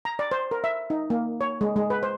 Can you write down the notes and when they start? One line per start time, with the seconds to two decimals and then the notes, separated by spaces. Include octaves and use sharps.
0.05 A#5
0.19 D5
0.31 C5
0.51 A#4
0.64 E5
0.90 D#4
1.10 A#3
1.41 C#5
1.61 G#3
1.76 G#3
1.90 B4
2.03 C5